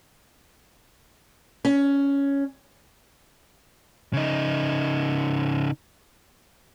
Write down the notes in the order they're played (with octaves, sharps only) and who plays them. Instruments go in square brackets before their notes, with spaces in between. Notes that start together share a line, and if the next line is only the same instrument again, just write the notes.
[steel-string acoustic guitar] C#4
[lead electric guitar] C#3 D#4